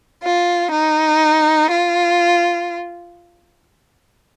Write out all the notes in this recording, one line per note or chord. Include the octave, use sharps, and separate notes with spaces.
F4
D#4
F4